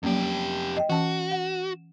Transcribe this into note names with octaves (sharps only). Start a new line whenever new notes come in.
F2 F#3 A#3 C#4 G4
D#5 G5
E3 C#4 F#4 A5
F#5